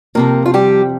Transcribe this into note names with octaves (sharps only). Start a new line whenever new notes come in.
F2 C3 F3 A#3 A#4
F4
G3 G4